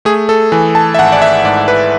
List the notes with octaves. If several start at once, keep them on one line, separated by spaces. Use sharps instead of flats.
A3 G#4
A4
E3 G#5
A5
E5
G#1 F#5
D5
E5
G#2 D5
B4